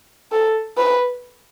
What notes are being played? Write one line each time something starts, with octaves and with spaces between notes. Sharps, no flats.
A4
B4